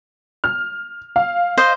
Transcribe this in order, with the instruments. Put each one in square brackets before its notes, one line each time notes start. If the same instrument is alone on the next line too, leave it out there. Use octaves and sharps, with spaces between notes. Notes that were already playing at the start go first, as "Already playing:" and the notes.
[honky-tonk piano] F6
F5
[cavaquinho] C5 D#5 F5